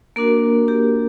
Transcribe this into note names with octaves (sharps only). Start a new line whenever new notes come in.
A#3 D4 F#4 A#4
G4